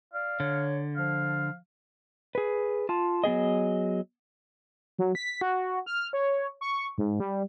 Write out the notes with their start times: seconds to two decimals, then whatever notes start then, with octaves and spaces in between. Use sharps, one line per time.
0.14 D5 F5
0.40 D3 C#5
0.97 F3 F5
2.35 G#4 B4
2.89 F4 A5
3.24 F#3 B3 G#4 D#5
4.99 F#3
5.15 B6
5.41 F#4
5.86 F6
6.13 C#5
6.61 C#6
6.98 G#2
7.20 G3